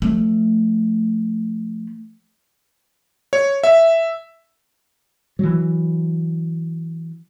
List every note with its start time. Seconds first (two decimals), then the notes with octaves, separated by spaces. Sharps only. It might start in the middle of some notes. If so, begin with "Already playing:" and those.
0.02 F3 A3
3.33 C#5
3.64 E5
5.39 E3 F#3